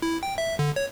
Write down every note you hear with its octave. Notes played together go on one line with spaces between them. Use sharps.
E4
G5
E5
D3
C#5